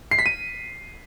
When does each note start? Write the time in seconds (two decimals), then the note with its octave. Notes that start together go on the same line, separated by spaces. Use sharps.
0.11 C7
0.19 B6
0.26 D#7